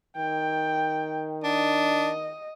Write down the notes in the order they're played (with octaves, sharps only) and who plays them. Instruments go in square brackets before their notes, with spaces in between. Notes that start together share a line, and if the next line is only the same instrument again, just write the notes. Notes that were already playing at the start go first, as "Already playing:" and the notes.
[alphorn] D#3 [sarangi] G5
[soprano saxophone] D4 [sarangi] D#5